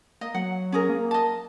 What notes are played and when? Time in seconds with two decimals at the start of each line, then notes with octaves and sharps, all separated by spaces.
0.21 A#3 D#5
0.34 F#3 F#5
0.72 C#4 G#4 A#4
0.89 A#3
1.11 D#5 A5